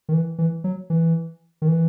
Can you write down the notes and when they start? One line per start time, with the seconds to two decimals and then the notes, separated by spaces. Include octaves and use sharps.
0.09 D#3
0.13 E3
0.38 E3
0.64 F#3
0.90 E3
1.62 D#3
1.68 E3